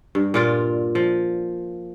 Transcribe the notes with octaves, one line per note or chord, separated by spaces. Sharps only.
G2
A#2 F4 D5
F3